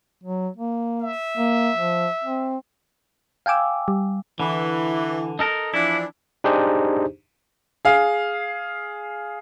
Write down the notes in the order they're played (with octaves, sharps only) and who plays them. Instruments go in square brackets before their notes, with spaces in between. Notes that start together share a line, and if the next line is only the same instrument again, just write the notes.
[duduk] F#3
A#3
[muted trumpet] E5
[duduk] A#3
F3
C4
[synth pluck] F5 G5 G#5 D6 E6
G3
[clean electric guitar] D3 [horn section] E3
[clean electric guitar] D#4 A4 A#4
[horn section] E3 F3 D4 [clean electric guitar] E4
[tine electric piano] D4 D#4 G4 G#4 C5
[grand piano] G#4 F5